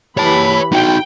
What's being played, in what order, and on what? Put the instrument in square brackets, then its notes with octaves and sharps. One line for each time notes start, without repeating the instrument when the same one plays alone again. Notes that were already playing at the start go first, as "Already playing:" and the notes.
[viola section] E3 G4 B5 [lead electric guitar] C#5 A5
[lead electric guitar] D#4 F#4 [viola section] G5